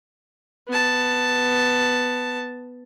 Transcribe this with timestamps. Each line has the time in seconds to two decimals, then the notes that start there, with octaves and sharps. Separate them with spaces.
0.68 B3 A5